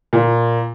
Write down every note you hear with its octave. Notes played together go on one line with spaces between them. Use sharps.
A#2